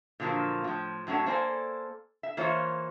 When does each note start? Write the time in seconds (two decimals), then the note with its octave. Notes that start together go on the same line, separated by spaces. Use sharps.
0.20 A#2 D3 F3 F#3 A#3
0.64 A2 F3
1.07 A2 F#3 C#4 D4 A4
1.26 A#3 A4 C5 D5 F#5 G#5
2.23 E5
2.37 E3 A#3 F4 C5 C#5